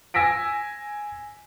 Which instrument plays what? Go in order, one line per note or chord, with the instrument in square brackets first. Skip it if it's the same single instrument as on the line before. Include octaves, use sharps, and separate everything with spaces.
[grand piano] G#5 E6 A#6 B6 D7